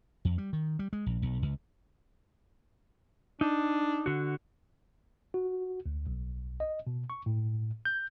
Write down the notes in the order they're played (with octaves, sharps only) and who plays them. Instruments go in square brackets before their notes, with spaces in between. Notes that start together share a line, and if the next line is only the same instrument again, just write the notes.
[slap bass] F2
G3
D#3
G3
G#3
A#1
B1
C#2
[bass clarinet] D4 [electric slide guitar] D#4
[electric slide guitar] D3 F#4
[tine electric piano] F#4
D2
B1
D#5
B2
C#6
A2
G6